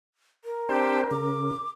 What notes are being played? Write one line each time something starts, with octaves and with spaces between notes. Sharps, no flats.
A#4
C4 D4 G4 C5
C#3 D6